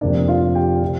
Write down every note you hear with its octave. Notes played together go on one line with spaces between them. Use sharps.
F1 F2 C3 A#3 D4 D5
F4 F5
G4 G5
C3 F3